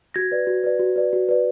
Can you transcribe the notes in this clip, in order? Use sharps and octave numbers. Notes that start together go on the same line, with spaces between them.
F#4 G#6 A#6
B4 D5
F#4
B4 D5
F#4
B4 D5
F#4
B4 D5